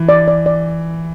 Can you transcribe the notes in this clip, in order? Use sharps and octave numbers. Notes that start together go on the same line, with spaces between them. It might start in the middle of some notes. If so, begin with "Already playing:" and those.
Already playing: E3
D5
D5
D5